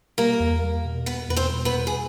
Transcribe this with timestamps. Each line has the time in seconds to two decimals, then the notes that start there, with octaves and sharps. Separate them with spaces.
0.18 G3 A#3 A#4
0.40 E2
0.63 G3
0.85 B2
1.06 B2 B3 B4
1.29 E2 B4
1.36 C4 C5
1.51 G3
1.65 B3 B4
1.74 E2
1.87 G#4